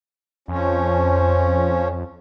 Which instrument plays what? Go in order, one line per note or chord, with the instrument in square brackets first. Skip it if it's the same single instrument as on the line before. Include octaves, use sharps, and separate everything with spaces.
[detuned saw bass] F2 [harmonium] F3 C#4